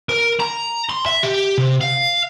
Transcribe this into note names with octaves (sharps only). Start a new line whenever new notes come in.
A#4
A#5
C6
E5
G4
C3
F5